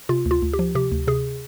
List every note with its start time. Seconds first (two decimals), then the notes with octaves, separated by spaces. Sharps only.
0.09 C3 F4
0.26 D2
0.31 F4
0.42 D2
0.53 G4
0.59 F3
0.75 C3 G4
0.92 D2
1.07 C3 G#4